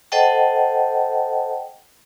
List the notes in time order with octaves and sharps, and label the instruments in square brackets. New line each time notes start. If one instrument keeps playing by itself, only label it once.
[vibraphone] A4 C5 D#5 F#5 G5 A5